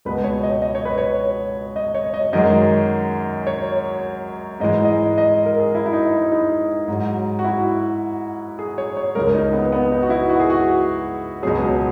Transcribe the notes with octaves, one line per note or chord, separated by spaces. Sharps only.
C#2 B2 G#3 B4
C#5
D#5
D#5
C#5
B4
C#5
D#5
C#5
D#5
F#2 D#3 G#3 D#5
C#5
G#2 E3 G#3 D#5
D#5
D#5
A#4
G#4
E4
E4
D#4
E4
D#4
G#2 F#3
F#4
E4
G#4
C#5
C#5
C#2 C#3 G#3 A#4
D#4
B3
B3
D#4
F#4
E4
F#4
G#4
F#4
C#2 B2 F#3 G#4